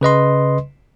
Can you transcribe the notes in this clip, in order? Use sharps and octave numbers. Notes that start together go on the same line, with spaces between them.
C#3 B4 D#5 C6